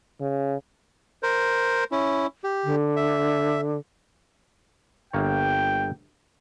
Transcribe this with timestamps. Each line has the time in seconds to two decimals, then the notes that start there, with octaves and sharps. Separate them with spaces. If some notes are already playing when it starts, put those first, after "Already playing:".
0.21 C#3
1.23 A#4 C5
1.91 C#4 E4
2.44 G4
2.64 D3
2.96 E5
5.13 G1 A#3 C#5 G5